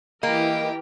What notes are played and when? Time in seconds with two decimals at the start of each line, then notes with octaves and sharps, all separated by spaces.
0.23 E3 A#3 G4 A#4 D#5 G5